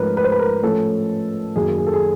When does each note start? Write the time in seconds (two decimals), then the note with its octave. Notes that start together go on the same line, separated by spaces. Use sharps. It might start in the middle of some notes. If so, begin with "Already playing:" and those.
Already playing: G#2 F3 A3 C#4 A#4 B4
0.17 B4
0.24 C5
0.32 B4
0.39 A#4
0.62 A2 F3 A3 C#4 A4
1.56 F#2 D#3 F#3 A#3 G#4
1.78 G#4
1.87 A4
1.94 G#4